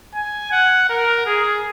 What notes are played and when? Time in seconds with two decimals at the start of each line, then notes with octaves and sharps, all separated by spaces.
0.15 G#5
0.52 F#5
0.89 A#4
1.26 G#4